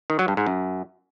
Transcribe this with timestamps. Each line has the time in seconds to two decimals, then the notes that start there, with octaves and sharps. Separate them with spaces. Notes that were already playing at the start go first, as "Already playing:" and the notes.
0.10 D#3
0.19 F#3
0.28 G2
0.37 G#2
0.46 F#2